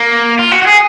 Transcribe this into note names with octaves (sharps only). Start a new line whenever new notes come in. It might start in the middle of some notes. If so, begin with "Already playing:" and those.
Already playing: A#3
F4
F#4
F#4
G#4